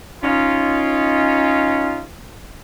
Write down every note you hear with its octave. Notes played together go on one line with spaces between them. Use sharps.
C#4 D#4 F4